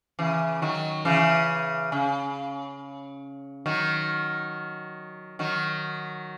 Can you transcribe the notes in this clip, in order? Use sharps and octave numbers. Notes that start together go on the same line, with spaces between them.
C#3 E3
D#3 F#3
C#3 E3
C#3
D#3 F#3
D#3 F#3